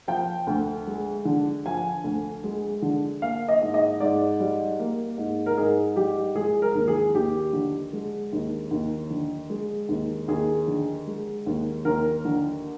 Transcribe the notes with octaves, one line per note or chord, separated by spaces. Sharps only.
F3 G5
D2
G#3
D3
F3 G#5
D2
G#3
D3
A#3 F5
D#5
G#2
D#5
G#2 D5
G3
A#3
G#2
A#4
G#2 G#4
G3 G4
G#3 G#4
A#4
D#2
G#4
D#2 G4
D3
G#3
D#2
D#2
D3
G#3
D#2
D#2 G#4
D3
G#3
D#2
D#2 A#4
D3